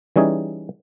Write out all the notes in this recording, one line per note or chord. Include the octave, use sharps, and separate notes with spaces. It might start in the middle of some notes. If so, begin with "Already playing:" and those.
E3 G3 C#4 D#4 G#4